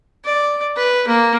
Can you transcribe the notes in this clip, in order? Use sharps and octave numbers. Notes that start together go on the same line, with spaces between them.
D5
B4
A#3